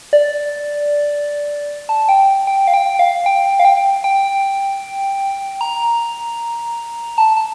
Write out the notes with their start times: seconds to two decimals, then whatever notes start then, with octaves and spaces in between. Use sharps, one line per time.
0.13 D5
1.89 A5
2.09 G5
2.47 G5
2.68 F5
2.74 G5
2.99 F5
3.26 G5
3.60 F5
3.65 G5
4.04 G5
5.61 A#5
7.18 A5
7.36 A5